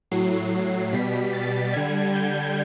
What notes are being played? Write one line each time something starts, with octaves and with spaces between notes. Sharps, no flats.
A2 F#3 C7
B2 G3 B6
A6
D3 G3 G#6
G6